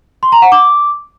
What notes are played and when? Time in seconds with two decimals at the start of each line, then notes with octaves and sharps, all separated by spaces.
0.23 C6
0.32 A#5
0.42 F#5
0.52 D6